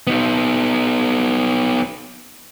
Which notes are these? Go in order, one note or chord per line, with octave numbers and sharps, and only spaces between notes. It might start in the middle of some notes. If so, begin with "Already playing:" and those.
B3 D#4